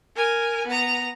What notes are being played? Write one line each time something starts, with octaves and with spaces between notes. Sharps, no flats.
A#4 G#5
B3 A#5